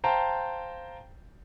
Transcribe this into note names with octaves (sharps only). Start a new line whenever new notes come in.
C5 F5 G5 A5 A#5